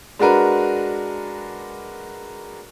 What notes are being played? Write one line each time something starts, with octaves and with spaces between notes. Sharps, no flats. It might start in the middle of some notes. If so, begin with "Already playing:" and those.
G#3 D4 F#4 A#4 B4